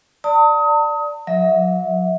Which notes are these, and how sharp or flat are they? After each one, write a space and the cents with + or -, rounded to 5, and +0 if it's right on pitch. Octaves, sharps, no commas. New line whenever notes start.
D5 +0 A5 +45 D#6 +30
F#3 -45 E5 -35